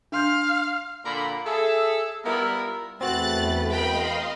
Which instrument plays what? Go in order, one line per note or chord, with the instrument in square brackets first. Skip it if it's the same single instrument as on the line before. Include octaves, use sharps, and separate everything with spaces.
[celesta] D4 C6 G6 [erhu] F5
[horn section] A#2 D3 A#4 F5 B5
G#4 A4 E5
G3 B3 E4 F4 A#4
[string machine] E2 [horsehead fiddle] A3 B4 [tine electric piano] C4 F#4 [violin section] F#6 A6
[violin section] A#4 G5 B5 [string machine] D#5 F5 C6